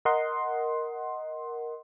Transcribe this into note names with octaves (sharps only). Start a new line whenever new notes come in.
A#4 D#5 F#5 C6